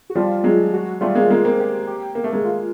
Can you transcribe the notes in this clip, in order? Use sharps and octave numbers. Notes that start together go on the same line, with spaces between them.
F#4
F3 G3 F4
F#3 G#3
F#4
G3 A3 F4
G#3 A#3
G#3 A#3
A#3 C4
G4
G4
A#3
A3
G#3 A#3
F4